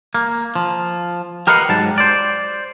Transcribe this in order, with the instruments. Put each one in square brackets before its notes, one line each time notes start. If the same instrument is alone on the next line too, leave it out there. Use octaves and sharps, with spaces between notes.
[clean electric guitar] A#3
F3
G4 A#4 B4 D#5 F5 F#5
G#2 F#3 G4 A5
C5 D5